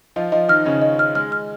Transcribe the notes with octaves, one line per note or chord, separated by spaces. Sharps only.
F3 F4 D#5
F3 F4 D#5
D#3 D#4 F6
C#3 C#4 D#5
D#5
F6
G#3 F6
F6